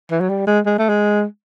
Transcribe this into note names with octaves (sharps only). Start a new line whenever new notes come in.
E3
F#3
G3
G#3
G#3
A3
G#3